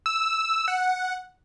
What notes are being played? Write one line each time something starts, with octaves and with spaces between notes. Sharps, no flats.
E6
F#5